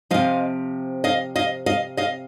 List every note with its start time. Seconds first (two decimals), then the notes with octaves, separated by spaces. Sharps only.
0.10 C3 F3 D#5 F5
1.04 D#5 F5
1.36 D#5 F5
1.66 D#5 F5
1.97 D#5 F5